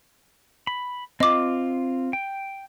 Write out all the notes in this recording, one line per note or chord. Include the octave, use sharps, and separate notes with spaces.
B5
C4 F4 D#5 D6
G5